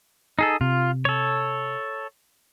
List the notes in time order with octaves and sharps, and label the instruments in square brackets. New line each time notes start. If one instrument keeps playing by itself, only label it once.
[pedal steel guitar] D#4 G#4 A4
[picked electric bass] C3 [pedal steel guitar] F4
[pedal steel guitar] A4 C#5